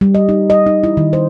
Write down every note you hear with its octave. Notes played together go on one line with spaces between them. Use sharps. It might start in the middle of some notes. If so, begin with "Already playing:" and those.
G3
D#5
D#4
D#5
D#4
E4
D#3
C5